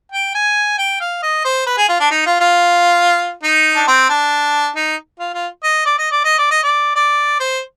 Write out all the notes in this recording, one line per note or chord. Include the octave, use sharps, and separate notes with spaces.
G5
G#5
G5
F5
D#5
C5
B4
G#4
F4
D4
D#4
F4
F4
D#4
D4
C4
D4
D#4
F4
F4
D#5
D5
D#5
D5
D#5
D5
D#5
D5
D5
C5